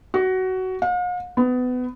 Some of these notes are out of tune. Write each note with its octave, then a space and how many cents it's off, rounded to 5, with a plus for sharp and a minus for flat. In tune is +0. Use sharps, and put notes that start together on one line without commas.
F#4 +15
F5 +45
B3 +25